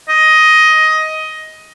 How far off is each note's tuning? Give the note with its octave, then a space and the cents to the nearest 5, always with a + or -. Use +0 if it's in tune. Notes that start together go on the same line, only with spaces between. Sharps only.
D#5 +10